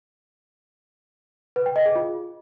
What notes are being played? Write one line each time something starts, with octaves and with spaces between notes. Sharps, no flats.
B4
G5
D#5
G#4
F4